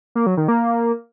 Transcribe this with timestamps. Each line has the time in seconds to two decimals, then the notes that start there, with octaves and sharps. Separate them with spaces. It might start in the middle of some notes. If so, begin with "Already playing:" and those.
0.15 A#3
0.26 F#3
0.37 D#3
0.48 A#3